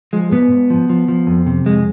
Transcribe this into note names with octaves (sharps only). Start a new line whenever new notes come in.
F3 G#3
G#2 B3
G#2
F3
F3
F3
F2
C3
F2 G#3